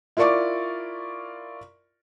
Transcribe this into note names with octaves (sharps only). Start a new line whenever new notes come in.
E4 F4 A#4 D5 C#6 D6